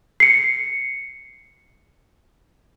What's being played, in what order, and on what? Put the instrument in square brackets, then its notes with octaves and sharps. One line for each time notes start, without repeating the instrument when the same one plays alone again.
[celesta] C7 C#7